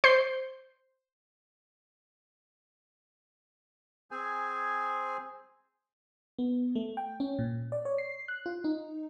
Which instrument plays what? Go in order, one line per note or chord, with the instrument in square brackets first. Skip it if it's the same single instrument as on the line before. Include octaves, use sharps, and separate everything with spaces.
[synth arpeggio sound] C5 G6 C7
[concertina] C4 G#4 C5 G#5
[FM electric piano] B3
A3
G5
C#4
A#2
D5
C#5
C7
F#6
F4
D#4